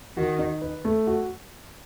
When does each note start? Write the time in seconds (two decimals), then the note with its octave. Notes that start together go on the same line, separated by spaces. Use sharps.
0.17 D#3 F#4
0.39 D#4
0.62 B4
0.85 A3
1.07 F#4